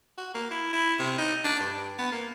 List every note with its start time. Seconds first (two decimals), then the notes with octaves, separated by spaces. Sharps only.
0.18 F#4
0.34 A#3
0.51 E4
0.73 E4
0.99 C3
1.18 D#4
1.44 D4
1.60 G2
1.99 B3
2.12 A#3